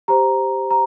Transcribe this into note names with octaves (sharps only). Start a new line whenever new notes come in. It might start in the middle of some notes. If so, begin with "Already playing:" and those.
G4 C5 A#5
A#5